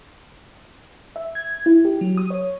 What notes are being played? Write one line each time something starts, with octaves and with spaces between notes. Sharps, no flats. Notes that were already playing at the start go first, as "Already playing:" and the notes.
E5
G#6
E4
G4
F#3
D#6
C#5